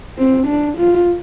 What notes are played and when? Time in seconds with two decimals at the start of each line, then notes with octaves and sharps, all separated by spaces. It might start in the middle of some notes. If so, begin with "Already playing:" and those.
0.18 C4
0.47 D4
0.77 F4